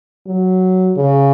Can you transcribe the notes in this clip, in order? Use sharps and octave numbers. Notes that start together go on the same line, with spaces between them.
F#3
C#3